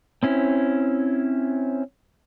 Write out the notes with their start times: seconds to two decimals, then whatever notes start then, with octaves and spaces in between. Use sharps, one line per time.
0.23 C4 C#4 E4